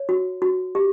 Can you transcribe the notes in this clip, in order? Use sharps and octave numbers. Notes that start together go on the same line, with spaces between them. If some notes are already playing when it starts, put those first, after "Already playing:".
Already playing: C#5
F#4
F#4
G4